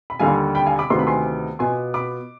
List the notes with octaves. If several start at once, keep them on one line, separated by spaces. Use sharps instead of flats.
B5
D#2 D3 G3 F5 G#5
G5 B5
F5 G#5
B5 D6
D2 C3 D#3 B3 F4 C6
B5
G#5 C6
B2 B3 F4 G#5 C6
B5 D6